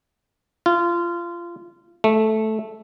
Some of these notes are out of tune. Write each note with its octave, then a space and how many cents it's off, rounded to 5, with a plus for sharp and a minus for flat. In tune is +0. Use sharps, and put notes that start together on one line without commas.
F4 -25
A3 -10